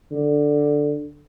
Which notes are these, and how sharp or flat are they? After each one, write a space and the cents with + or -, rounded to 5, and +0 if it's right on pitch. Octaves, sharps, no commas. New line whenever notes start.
D3 +0